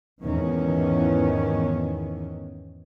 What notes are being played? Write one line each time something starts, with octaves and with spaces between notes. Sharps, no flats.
E2 G#2 D#3 E3 C#4